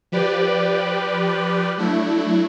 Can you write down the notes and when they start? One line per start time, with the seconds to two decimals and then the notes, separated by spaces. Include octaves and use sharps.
0.12 F3 G4 B4 D5
1.78 F#3 A3 D4 E4